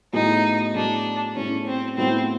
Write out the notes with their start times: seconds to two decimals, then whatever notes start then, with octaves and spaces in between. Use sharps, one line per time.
0.13 A2 F#3 B3 D#4 E4 G#4
0.74 A2 F#3 B3 D4 E4 G#4
1.36 A2 F#3 B3 C#4 E4 G#4
1.66 C4
1.97 A2 F#3 B3 C4 E4 G#4